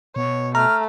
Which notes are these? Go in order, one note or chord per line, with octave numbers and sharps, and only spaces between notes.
B2 C#5
A3 A#5 F6